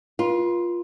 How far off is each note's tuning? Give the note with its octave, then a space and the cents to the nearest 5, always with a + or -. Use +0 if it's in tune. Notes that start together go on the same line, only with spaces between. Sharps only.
F4 +0 B4 -45